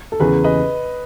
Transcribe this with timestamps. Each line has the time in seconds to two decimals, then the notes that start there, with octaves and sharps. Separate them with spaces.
0.12 A4
0.20 E2 C#3 E3 G#4 B4
0.44 B4 D#5